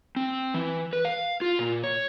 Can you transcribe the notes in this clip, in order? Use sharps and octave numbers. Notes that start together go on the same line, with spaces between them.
C4
E3
B4
F5
F4
A#2
C#5